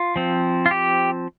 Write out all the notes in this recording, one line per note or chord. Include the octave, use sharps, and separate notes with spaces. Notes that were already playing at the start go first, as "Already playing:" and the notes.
Already playing: F4
F3 C4
F4
G4